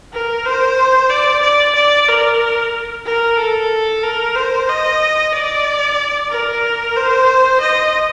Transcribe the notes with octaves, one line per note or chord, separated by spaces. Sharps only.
A#4
C5
D5
D5
D5
A#4
A#4
A4
A#4
C5
D#5
D5
A#4
C5
D#5